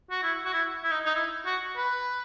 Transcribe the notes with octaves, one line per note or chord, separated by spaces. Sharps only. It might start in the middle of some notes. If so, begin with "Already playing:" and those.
F#4
E4
F#4
E4
E4
D#4
D#4
E4
F#4
B4